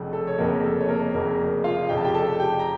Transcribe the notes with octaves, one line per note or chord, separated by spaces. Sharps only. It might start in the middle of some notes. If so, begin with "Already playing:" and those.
Already playing: F1 F2 C#3
A4
C#5
F1 F2 C#3 A#3 A#4
A4
C#5
A#3 A#4
F1 F2 C#3 A#3 A#4
F4 F5
F1 F2 C#3 G5
A5
G4 G5
A4 A5
G4 G5
A#5